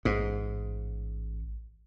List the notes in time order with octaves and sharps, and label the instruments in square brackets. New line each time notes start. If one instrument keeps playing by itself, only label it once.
[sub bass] A1 [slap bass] G#2